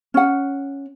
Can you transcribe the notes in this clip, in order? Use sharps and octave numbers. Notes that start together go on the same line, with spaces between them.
C#4 F#5